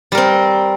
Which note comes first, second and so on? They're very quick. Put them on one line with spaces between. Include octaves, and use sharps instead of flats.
G3 A#4 C4